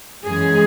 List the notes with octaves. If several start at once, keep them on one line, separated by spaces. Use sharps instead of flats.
F#2 E3 G#3 C#4 G#4